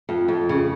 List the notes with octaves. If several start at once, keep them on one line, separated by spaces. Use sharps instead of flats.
F2
F2
C#3